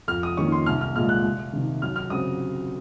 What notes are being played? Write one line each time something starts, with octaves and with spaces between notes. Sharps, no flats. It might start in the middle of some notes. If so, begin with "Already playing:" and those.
F2 F6
D#6
D#3 A#3 C#4 C#6
C6
C2 F6
F6
A#2 G#3 F6
F#6
C2
C3 D#3
F#2 F6
F6
C#3 F#3 C4 D#6